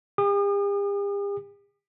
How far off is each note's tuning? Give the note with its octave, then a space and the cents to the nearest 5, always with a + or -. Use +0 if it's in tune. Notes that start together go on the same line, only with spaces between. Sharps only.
G4 +45 D#6 -40